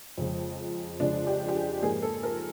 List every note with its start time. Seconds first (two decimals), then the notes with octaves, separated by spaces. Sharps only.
0.18 F2 C#3 F3 G#3
0.99 F2 C#3 F3 G#3 D4
1.27 G4
1.48 G4
1.55 G#4
1.82 G#2 F3 A#3 G#4
2.02 A4
2.23 A#4